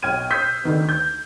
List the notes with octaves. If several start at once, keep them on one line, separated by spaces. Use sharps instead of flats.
B1 G5 F6 G#6 D#7
D#6 E6 G6 B6 C7
D2 D#3 B3
G6